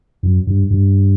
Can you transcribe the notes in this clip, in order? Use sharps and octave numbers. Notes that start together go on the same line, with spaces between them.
F#2
G2
G2